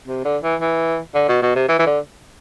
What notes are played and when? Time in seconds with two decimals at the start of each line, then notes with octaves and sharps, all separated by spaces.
0.08 C3
0.25 D3
0.43 E3
0.61 E3
1.15 D3
1.29 B2
1.42 B2
1.55 C3
1.68 E3
1.79 E3
1.86 D3